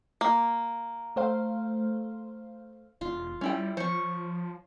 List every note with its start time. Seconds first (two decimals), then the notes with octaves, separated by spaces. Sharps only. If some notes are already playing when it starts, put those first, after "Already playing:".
0.21 A#3
1.16 A3 C5 F5
3.01 E1 F4
3.41 G3 C#4 E4 G5
3.77 F3 C5 C#5 C#6